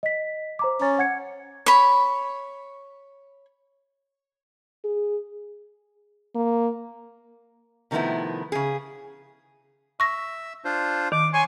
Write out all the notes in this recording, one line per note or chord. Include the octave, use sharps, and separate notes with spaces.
D#5 B6
C5 A#5 D6
C#4 A#5 A6
F#5 G#6 C#7
C#5 B5
G#4
A#3
C3 D#3 F3 A3 B3 E4
C#3 G#4
E5 C#6 A#6
D4 F4 C5
D#3 D6
C#5 G#5 C6 C#6